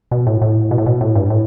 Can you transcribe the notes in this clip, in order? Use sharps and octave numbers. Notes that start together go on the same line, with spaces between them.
B2
A2
A2
B2
A2
B2
A2
G2
A2